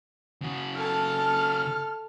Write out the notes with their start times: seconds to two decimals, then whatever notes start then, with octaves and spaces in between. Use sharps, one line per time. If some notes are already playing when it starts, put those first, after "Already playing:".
0.42 C#3 F#4
0.76 A4 A5 F6